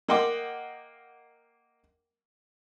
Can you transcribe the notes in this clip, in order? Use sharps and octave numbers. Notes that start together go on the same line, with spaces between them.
A#3 D#5 F#5 G5 C6 D6